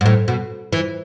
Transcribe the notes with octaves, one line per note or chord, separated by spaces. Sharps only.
G#2
A2
B2
E3